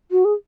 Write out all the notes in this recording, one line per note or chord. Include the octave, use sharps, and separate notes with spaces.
F#4
G#4